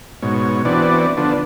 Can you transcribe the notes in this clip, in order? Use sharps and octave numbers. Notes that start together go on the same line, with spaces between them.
G#2 B2 C#5
E3 B3 C4 D4 F#4 D5
D3 F3 B3 D4